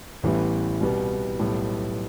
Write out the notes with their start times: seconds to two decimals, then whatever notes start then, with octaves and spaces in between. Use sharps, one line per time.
0.23 A1 A2 E3 G3 B3
0.81 C2 B2 G3 B3
1.39 B1 A2 G3 B3